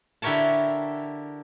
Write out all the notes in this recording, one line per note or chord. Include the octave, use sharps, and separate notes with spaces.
D3 E4 G4 A#4 C#5 A5